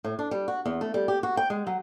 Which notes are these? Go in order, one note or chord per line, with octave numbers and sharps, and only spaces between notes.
A2
D4
G3
F#4
E2
A3
G3
G4
F#4
G5
G#3
F#3